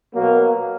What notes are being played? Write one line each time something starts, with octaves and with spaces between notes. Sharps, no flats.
B2 F#3 A#3